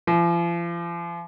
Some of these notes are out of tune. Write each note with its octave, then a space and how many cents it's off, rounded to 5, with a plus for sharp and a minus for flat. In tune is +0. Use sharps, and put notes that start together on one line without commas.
F3 -40